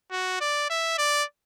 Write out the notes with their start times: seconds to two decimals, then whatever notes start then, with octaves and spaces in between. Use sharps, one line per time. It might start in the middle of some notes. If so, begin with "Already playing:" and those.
0.11 F#4
0.41 D5
0.70 E5
0.98 D5